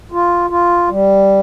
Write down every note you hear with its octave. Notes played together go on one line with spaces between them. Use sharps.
F4
F4
G3